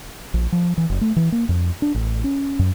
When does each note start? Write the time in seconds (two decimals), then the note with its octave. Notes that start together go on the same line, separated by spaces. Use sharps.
0.34 A#1
0.52 F3
0.77 E3
0.90 F#1
1.01 A3
1.16 E3
1.32 A#3
1.49 F2
1.82 D4
1.94 A1
2.24 C#4
2.59 F#2